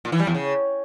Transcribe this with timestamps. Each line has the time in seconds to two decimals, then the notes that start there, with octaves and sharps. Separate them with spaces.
0.05 A#2
0.12 E3
0.20 G3
0.27 E2
0.34 C#3